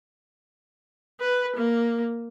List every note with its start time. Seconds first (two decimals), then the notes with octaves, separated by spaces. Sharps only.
1.21 B4
1.56 A#3